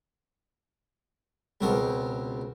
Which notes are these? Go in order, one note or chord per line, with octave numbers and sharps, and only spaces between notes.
C#2 B2 C4 A#4